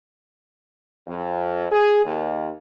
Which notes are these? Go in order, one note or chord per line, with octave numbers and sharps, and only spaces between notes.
F2
G#4
D#2